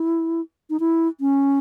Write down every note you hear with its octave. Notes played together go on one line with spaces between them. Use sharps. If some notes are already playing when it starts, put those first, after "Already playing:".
Already playing: E4
D#4
E4
C#4